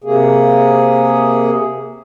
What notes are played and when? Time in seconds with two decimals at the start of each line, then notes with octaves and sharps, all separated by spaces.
0.04 C3 A#3 G#4